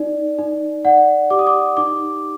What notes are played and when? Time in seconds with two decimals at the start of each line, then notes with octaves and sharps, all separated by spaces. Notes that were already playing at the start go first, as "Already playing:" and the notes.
Already playing: D#4 D5
0.39 D#4
0.85 D5 F#5
1.30 G4 D6
1.39 D#6
1.47 D6
1.77 D#4 D6